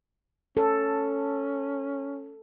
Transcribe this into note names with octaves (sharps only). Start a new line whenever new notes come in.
C#4 A4